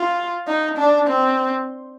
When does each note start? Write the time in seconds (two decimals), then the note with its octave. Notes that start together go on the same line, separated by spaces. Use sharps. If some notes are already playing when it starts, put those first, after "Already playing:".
Already playing: F4
0.47 D#4
0.77 D4
1.08 C4